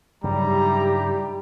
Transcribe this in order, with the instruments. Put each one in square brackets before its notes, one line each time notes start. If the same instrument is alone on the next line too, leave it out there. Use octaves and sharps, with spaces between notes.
[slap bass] G2 C#3 F#3 [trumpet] G3 [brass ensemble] D#4 E4 G4 [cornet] A#5